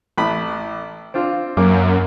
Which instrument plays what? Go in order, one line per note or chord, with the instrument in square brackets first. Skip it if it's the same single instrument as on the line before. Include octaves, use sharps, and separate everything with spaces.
[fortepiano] A1 B5
C4 D4 F4
[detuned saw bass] F#2 [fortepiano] A#3 D6